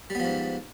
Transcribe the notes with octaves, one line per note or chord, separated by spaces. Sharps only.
G#2 F3 G3 B3